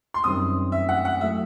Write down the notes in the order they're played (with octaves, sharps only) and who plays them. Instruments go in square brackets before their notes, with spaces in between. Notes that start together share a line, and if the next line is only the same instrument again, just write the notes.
[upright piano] C6
[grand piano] F#2 D#3 G3 C4 [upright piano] D#6
[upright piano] E5
F#5
F#5
[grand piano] F#3 A3 E4 [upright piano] E5